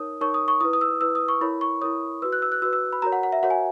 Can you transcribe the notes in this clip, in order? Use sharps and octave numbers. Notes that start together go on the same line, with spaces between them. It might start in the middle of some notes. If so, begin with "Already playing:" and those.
Already playing: D#4 A#4 C#5 D#6
D#4 A#4 C#5 C#6
D#6
C#6
E4 B4 D#6
D#6
E6
E4 B4 E6
D#6
C#6
E4 A#4 C#5 B5
C#6
E4 A#4 C#5 D#6
F#4 B4 E6
F#6
E6
F#6
F#4 B4 E6
E6
B5
F#4 A#4 C#5 A#5
F#5
F#5
E5
F#4 A#4 C#5 F#5
G#5